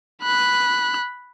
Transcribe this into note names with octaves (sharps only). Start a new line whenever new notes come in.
B5 F#6